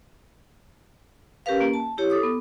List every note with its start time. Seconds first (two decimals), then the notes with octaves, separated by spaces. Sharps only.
1.46 C#4 G4 A#4 B4 F5
1.61 A#3
1.74 A5
1.98 E4 G4 C#5
2.10 A4 D6 D#6
2.23 B3